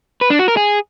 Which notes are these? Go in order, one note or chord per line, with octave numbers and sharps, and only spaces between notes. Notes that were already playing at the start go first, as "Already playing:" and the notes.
B4
D4
F#4
A#4
G#4